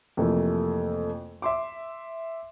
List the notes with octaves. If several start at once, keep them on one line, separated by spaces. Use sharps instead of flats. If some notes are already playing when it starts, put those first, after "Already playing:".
F2 C3 E3 A3 A#3
E5 C6 D6